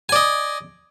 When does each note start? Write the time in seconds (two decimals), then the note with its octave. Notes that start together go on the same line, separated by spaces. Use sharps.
0.09 G#5
0.12 D5
0.16 D#5